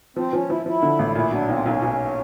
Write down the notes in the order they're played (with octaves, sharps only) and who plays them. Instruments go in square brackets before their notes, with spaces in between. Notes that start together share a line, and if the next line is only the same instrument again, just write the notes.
[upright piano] F3 [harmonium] C4
[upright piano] F3 [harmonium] C#4
[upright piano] F3 [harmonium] E4
[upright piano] F3 [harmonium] E4
[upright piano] D3
A1
[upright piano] A#2 [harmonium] E4
[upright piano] F#3 [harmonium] D4
[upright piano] B1 [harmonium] C4
[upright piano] B1 [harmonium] C#4
[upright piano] B1